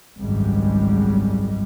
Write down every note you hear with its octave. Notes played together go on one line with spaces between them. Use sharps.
G#1 C#2 F#2 G3 G#3